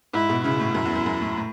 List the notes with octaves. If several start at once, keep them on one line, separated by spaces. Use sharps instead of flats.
G#2 E4
B2
C#3 E4
A2
F#2
E2
F#2
F#2
A2
A2